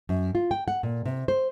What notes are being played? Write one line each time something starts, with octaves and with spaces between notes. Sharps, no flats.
F#2
F4
G5
F#5
A#2
C3
C5